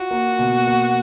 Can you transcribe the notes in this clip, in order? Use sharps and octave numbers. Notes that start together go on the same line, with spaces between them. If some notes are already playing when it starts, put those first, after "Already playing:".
Already playing: F4 F#4
A#3
B2
A#3